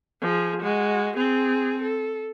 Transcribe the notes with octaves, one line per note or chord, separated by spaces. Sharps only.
F3 G#4
G#3 F#4
C4 G#4
A4